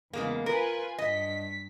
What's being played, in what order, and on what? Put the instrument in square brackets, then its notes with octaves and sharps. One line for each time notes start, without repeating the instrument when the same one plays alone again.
[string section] E2 [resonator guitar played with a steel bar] C#3 G#3 A#3
[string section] F4 B4 G#5 [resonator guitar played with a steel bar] A#4
[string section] G2 B6 [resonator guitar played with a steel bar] D#5